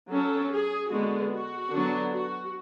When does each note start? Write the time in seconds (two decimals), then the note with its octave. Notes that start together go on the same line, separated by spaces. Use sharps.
0.11 F#3 C#4 A4
0.51 G#4
0.91 D3 G#3 B3 F#4
1.32 F#4
1.72 D3 F#3 B3 D4
2.12 F#4